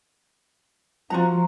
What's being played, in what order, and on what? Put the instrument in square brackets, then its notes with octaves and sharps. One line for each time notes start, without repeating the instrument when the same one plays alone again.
[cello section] F3 [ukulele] F4 F#4 A#5